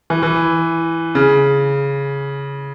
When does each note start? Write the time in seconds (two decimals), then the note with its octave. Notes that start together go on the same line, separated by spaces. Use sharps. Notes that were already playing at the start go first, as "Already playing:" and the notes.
0.10 E3
0.23 E3
1.15 C#3